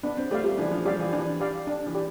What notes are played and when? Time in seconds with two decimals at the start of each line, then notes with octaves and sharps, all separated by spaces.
0.03 B3 D4
0.17 C4
0.31 A3 G4 D5 F5
0.44 G3
0.58 E3 D4
0.71 F3
0.85 G3 G4 D5 F5
0.99 E3
1.13 E3 D4
1.40 G4 D5 F5
1.67 D4
1.86 E3
1.95 G4 D5